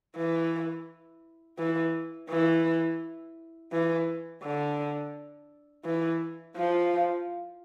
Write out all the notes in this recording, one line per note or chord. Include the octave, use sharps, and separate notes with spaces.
E3
E3
E3
E3
D3
E3
F3